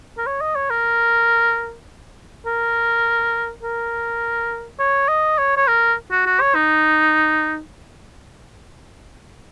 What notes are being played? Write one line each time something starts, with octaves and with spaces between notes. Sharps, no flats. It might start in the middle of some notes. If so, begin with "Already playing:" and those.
A#4
C#5
D#5
C#5
A#4
A#4
A#4
C#5
D#5
C#5
C#5
A#4
F#4
F#4
C#5
D#4